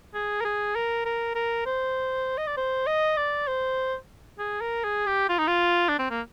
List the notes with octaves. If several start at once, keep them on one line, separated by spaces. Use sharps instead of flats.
G#4
A#4
G#4
A#4
A#4
A#4
C5
D#5
D5
C5
D#5
D5
C5
G#4
A#4
G#4
G4
F4
D#4
F4
D4
C4
A#3